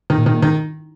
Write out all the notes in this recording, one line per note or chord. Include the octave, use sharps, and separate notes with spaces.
D#3
A#2
D#3
D#3